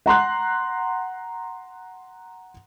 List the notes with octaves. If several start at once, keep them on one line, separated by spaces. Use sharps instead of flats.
F#5 A#5 C6 F#6